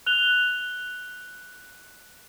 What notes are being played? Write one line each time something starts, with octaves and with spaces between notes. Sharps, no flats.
F#6 F7 G7